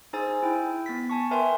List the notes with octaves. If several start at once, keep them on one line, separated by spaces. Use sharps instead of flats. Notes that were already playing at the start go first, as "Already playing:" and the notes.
D#4 G#4 C5 G#5 E6 A6
E4 G5
B3 A6 B6
G#5 A5 C#6
A#4 B4 E5 G5 G#5 C6